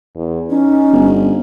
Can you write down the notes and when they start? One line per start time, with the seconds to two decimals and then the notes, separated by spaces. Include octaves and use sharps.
0.16 E2
0.50 C#4 D#4
0.93 G1